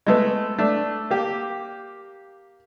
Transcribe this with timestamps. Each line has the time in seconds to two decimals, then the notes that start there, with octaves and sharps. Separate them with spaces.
0.07 G#3 A3 B3
0.58 A3 D4
1.10 A#3 G4